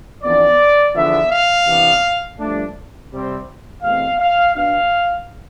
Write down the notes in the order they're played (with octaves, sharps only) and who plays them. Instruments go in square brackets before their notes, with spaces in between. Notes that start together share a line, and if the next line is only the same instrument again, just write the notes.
[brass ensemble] F2 E3 B3 D4 D5
E2 D3 F3 B3 D4 E5
F5
C3 E3 B3 D4
G2 F3 A3 D4
C3 G3 C4
E2 B2 A3 C4 F5
F5
B2 B3 D4 F5